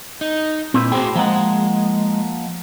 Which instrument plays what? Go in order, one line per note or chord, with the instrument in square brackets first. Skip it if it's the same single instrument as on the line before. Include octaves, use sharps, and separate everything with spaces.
[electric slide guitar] D#4
[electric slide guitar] A#2 [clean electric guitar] C4 E4 B4
[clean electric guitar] A2 C5 G5 [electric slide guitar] F#4 G#4
[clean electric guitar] F3 A#3 F#5 [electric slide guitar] G#3